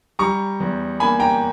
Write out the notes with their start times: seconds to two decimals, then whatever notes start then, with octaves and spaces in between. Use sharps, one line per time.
0.19 G3 A#5 C#6
0.60 E2
1.00 A#3 G#5 B5
1.20 G5 A#5